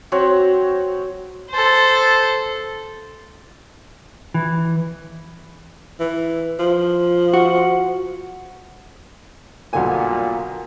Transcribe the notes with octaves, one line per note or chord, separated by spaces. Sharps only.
F#3 C4 C#5 F#5
A4 C5
E3
E3
F3
F#4
B1 A#2 D3 G#5